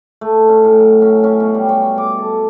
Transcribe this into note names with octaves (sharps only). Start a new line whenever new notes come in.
A3
C#4
A2
F#3
C#4
C#4
B2
G3
C#5
D6
A4